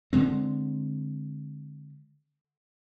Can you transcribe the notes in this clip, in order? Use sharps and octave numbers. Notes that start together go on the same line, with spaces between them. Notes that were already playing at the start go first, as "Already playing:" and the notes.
D3 G#3 C4